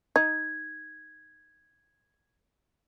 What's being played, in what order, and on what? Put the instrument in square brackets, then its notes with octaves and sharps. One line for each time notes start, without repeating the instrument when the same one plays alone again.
[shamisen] D#4 [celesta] G#6